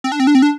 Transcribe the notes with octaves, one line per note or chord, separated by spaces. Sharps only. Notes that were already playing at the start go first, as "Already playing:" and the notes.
C4
D4
C4
D4
C4
D4